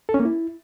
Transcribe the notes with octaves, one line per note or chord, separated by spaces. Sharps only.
A4
C#4
A#3
E4